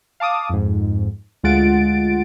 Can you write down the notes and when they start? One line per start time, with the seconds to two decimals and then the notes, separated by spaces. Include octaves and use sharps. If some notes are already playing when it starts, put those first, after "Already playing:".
0.20 F5 A5 D6 D#6
0.49 F2 G#2
1.43 D2 G#3 F4 F#5 A6 D7